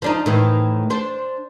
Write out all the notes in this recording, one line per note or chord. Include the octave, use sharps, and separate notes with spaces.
F3 D4 D#4
A2 D#3 E3
D4 C5